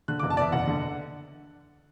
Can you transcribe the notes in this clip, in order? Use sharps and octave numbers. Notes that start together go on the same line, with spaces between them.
D3 F#6
F#1 D6
A5
E2 D5 E5
F#1 F#5
D3